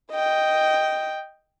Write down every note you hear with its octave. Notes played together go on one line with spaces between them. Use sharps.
D#5 G5